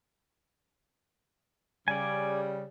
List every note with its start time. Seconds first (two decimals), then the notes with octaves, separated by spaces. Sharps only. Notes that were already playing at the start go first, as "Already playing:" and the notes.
1.88 C#3 G3 D5 G#5